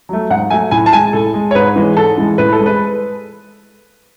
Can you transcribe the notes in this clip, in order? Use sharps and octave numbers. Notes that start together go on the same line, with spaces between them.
F#3 A3
G#2 F#5
F#3 A3 G#5
A2 G#5
A5
G#3 G#5
A2 A4
G#3
C#5
G#2 B4
E3 G#3
G#2 A4
E3 G#3
A2 B4
A4
G#3
B4